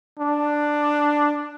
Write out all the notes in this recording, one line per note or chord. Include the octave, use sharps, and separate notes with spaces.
D4